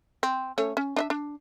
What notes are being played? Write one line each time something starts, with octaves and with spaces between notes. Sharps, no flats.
C4
A3 C#4 C#5
C#4
D4 D#5 E5
D4